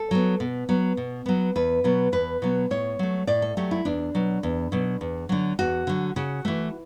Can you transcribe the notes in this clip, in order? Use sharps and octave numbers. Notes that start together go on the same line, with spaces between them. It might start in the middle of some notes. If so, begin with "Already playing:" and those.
Already playing: A4
F#3 B3
B2
F#3 B3
B2
F#3 B3
E2 B4
B2 F#3 B3
E2 B4
B2 F#3 B3
A2 C#5
F#3 A3
A2 D5
A4
F#3 A3 G4
E4
E2 D4
B2 F#3
E2
B2 F#3
E2
D3 F#3
E2 F#4
D3 F#3
C#3 F#4
E3 A3